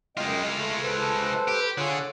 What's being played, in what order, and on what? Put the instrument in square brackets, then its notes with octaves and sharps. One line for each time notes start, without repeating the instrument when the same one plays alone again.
[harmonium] F#2 D#5 G5 [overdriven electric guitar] G#3 F4
[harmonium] A3
A4 B4 C5
[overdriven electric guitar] G4
[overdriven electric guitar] D3 [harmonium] F4 G#4 C#5